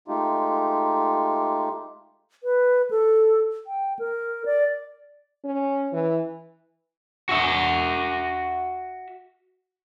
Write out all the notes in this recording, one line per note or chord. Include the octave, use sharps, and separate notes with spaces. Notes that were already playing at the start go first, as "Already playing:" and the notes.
G#3 A3 D#4 F4 G4
B4
A4
G5
A#4
D5
C#4
E3
F#4 E5